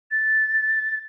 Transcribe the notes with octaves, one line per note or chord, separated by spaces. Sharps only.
A6